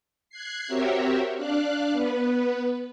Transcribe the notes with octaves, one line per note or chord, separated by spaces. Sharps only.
F#6 G#6 C7
C4 F#4 G4 A#4 C#5 E5
D4 D5 F5 F#6
B3 B4